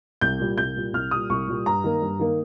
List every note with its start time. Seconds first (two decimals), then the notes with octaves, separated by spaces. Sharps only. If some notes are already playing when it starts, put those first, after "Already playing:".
0.21 C2 G6
0.39 A#2 G3
0.58 C2 G6
0.76 A#2 G3
0.93 C2 F6
1.11 A#2 G3 D#6
1.30 C2 C#6
1.47 A#2 G3
1.66 G2 A#5
1.84 D#3 A#3
2.02 G2
2.20 D#3 A#3